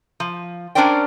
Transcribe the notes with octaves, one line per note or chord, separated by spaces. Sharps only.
F3
C#4 D4 A#4 C5 D5 G5